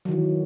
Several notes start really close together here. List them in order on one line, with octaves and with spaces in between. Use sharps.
F#3 D#3 E3